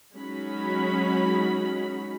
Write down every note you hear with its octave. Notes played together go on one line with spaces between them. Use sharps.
F#3 G#3 C#4 D#4 F#4 B5